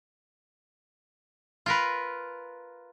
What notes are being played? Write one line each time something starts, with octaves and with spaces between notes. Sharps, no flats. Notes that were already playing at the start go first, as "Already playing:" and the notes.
F4 A#4 B4